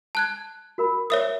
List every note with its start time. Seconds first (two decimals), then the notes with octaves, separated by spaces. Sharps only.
0.15 A5 F#6 G#6
0.78 F#4 A#4 B5
1.10 A#4 C#5 E5 D#6